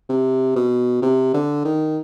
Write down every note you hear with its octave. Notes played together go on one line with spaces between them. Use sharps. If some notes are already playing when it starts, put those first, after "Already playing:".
C3
B2
C3
D3
D#3